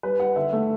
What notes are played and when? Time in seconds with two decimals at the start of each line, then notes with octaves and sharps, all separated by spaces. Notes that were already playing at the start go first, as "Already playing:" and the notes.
0.03 G3 B4
0.20 G3 F#5
0.36 D3 E5
0.53 A3